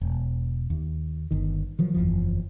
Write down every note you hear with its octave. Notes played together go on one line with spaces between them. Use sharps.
E1
D#2
G1 D#3
D#3 F3 F#3
F#1 E2 F3